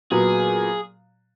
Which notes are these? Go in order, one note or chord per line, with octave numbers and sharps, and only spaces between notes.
A#2 F#3 B3 G#4